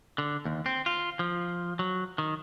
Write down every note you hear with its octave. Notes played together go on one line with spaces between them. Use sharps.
D3
D#2
C4
F4
F3
F#3
D#3